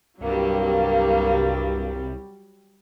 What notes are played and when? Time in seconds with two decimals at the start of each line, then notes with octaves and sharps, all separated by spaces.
0.21 C2 G2 F#3 G3 A#3